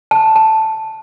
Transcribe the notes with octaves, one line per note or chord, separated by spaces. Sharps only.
A5
A5